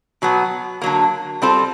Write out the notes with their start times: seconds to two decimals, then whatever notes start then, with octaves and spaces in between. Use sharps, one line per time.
0.22 B2 F#3 B3
0.81 D3 F#3 A#3
1.42 G3 C4 F4 A4 C5